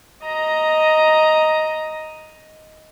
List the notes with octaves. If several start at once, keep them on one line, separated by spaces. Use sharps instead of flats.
D#5 A#5